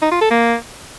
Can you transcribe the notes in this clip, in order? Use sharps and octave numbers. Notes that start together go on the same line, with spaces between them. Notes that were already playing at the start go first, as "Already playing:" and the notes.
D#4
F4
A4
A#3